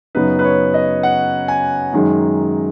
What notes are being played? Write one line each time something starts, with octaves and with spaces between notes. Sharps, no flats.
F#2 C#3 F#3 B3 D#4 B4
B4
C#5
D#5
F#5
G#5
F#2 D#3 G#3 D#4